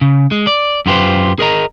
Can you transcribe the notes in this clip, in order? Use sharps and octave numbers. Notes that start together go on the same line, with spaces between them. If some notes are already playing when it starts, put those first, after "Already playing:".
C#3
G#3
D5
F#2 E4 F4 G4 B4 C5
G#4 A#4 D#5 A#5